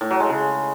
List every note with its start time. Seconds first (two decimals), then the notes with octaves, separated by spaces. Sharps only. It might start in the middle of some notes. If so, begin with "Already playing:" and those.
0.01 A2
0.10 F#3
0.20 G#3
0.30 C#3